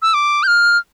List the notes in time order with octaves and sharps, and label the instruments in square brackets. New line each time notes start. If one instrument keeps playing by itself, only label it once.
[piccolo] E6
D6
G6
F6